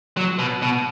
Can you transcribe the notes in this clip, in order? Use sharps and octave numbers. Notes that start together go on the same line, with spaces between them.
F#3
B2
B2